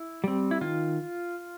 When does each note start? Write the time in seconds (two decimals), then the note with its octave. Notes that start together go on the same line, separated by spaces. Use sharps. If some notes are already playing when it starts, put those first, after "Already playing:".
Already playing: E4
0.24 G3 C4
0.51 E4
0.61 D#3 F4